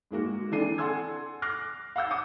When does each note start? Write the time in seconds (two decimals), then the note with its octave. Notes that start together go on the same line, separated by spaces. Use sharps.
0.11 G#2 G#3 A#3 F#4
0.51 E3 C4 D4 A4 C7 D#7
0.78 A4 F#5 G#5 C6 E6 G#6
1.42 D6 F6 F#6 A#6 C7
1.96 F5 F#5 E6 G6
2.10 D6 D#6 C#7